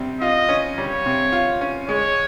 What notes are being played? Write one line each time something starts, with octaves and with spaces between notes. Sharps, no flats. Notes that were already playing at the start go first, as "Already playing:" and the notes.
Already playing: C3 G3
F4 D#5
C#4
G3 C#5
C3
F4
C#4
G#3 C#5